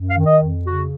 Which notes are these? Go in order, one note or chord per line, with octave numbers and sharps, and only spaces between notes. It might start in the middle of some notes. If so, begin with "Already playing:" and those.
Already playing: F#2
F5
D#3
D#5
F2
C#3 F#4